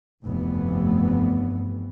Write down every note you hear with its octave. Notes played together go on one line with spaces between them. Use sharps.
F1 D2 G2 E3 B3